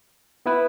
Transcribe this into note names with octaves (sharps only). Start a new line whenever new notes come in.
B3 E4 B4